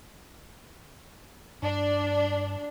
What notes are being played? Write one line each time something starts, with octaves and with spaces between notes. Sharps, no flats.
G2 D4